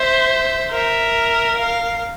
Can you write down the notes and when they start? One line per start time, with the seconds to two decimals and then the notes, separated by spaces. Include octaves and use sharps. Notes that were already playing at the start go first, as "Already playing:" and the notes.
Already playing: C5 E5
0.71 A#4 E5
1.57 F5